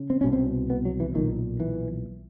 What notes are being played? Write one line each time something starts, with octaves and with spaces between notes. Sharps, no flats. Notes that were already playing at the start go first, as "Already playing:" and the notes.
Already playing: C#3
C4
C2 B2 C#4
C4
B3
F#3
E3
B1 A#2 D#3
E3